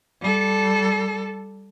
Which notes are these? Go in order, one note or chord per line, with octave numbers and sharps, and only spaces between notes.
G3 A4